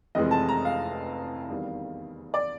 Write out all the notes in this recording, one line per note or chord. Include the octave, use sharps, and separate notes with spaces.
F1 F2 C3 E3 G#3 D#5
A5
A#5
F5
E2 C3 D#3 G3
D5